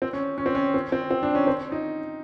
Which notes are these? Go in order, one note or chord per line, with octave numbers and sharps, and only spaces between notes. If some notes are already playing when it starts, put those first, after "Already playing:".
C4
C#4
C#4
C4
C#4
C4
C4
C4
D4
C#4
C4
D#4